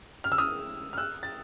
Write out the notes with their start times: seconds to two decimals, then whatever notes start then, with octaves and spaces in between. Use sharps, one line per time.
0.24 F6
0.32 E6
0.38 D#6 F6
0.93 F6
0.97 E6 F#6
1.23 A6